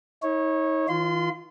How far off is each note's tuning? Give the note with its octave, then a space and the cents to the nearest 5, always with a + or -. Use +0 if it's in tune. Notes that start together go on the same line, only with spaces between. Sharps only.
D#4 +40 C#5 -20
E3 -40 F4 +0 C6 -30